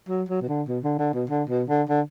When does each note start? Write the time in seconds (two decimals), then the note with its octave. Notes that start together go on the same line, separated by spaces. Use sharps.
0.09 F#3
0.29 F#3
0.42 B2
0.48 D3
0.68 B2
0.84 D3
0.99 D3
1.14 B2
1.29 D3
1.49 B2
1.69 D3
1.89 D3